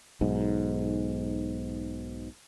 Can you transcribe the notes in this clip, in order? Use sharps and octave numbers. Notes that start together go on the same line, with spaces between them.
B1 G#2